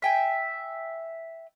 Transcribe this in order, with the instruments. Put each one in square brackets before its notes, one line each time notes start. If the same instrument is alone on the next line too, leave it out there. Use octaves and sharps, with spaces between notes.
[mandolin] E5 G5 G#5